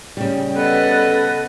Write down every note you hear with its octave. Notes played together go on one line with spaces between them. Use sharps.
C#3 G3 G5
B3 A4 B4 D#5